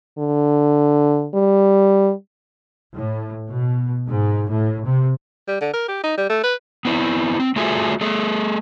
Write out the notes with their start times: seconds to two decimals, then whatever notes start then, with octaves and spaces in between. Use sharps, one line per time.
0.19 D3
1.35 G3
2.94 A2
3.50 B2
4.08 G#2
4.50 A2
4.85 C3
5.48 G3
5.61 D3
5.73 A#4
5.88 G4
6.03 D#4
6.17 G3
6.29 A3
6.43 B4
6.85 B3 C4 E4
7.40 C4
7.56 A3 F4 F#4 G#4 A4 E5
8.01 A3 G#4 A4